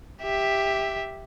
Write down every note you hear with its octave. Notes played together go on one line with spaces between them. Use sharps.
G4 E5